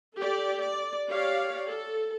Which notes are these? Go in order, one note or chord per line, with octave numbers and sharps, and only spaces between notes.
G4 A4 D5
D5
G4 C#5 D5 F5
A4